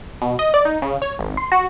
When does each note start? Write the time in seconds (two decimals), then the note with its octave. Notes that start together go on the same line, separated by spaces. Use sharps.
0.22 B2
0.39 D#5
0.54 D5
0.65 D#4
0.82 C#3
1.02 C#5
1.19 G#1
1.37 C6
1.52 F#4